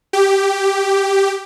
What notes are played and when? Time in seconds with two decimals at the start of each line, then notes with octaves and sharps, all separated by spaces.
0.13 G4